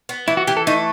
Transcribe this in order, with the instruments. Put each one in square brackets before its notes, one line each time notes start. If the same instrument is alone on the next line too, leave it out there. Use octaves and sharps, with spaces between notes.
[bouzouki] B3
[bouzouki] E3 [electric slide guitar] E4
[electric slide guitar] F#4
[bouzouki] E3 [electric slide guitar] G4
[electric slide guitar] A4
[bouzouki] A3 [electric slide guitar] D#4